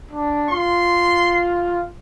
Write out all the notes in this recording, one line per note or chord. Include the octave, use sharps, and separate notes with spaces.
D4
F4 C6